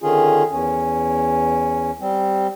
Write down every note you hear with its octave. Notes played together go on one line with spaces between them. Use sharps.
D3 D#3 C#4 F4 G#4
E2 C#4
G3 C4